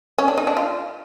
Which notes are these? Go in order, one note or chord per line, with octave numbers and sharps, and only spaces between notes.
C#4
D4
D#4
D4
F4